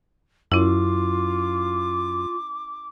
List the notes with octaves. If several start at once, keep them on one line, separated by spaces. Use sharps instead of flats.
F#2 C#4 E4 F4 D6